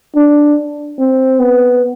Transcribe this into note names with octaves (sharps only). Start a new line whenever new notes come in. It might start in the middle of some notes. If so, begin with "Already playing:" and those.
D4
C4
B3